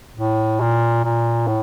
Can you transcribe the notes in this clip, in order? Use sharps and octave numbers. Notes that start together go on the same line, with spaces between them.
A2
A#2
A#2
A2